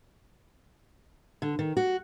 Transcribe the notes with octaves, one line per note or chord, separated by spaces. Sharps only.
D3
D#3
F#4